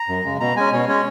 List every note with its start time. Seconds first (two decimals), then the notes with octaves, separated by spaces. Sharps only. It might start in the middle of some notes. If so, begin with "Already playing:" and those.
Already playing: A#5
0.09 F#2
0.25 C#3 G#3
0.40 B2 A#5
0.56 G#3 C#4 G#5
0.73 B2 C#5
0.88 G#3 C#4 C#5